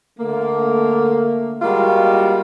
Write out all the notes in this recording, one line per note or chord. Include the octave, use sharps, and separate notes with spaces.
D3 A3 A#3
G3 G#3 A#3 F4 F#4